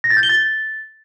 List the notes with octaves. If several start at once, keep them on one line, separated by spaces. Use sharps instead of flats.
A#6
A6
G6
G7
A6